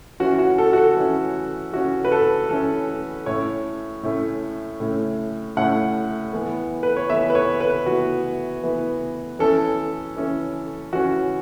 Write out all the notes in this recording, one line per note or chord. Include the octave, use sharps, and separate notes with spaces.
E3 C#4 F#4
F#4
A4
F#4
A4
E3 C#4
E3 C#4 F#4
B4
A4
E3 C#4 A4
A2 A3 C#4 C#5
A2 A3 C#4
A2 A3 C#4
A2 A3 C#4 F#5
E3 B3
B4
C#5
E3 B3 E5
B4
C#5
B4
E3 B3 F#4
E3 B3
E3 C#4 A4
E3 C#4
E3 C#4 F#4